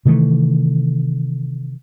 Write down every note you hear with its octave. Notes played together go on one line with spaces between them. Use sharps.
C3 D#3 E3 A3